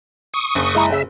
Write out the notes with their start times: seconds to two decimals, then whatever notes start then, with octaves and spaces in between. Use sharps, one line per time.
0.34 C#6 D#6
0.55 F#1
0.75 G#3 E4 A#5
0.92 C#3 E5